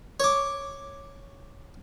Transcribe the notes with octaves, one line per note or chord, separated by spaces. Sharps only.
C#5 D6